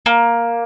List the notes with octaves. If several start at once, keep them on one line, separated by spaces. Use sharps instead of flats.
A#3